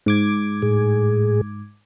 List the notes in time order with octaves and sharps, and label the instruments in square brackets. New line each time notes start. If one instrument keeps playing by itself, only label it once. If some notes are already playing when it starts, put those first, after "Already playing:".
[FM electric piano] G#2 D6 G#6
[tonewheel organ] A2 G#4